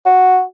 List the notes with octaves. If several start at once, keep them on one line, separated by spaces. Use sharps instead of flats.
F#4